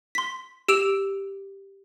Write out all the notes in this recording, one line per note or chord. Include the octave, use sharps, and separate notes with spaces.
C6 B6
G4 E6 D7 E7 F7